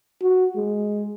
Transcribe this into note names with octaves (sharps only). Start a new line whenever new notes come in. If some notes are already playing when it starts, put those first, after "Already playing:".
F#4
G#3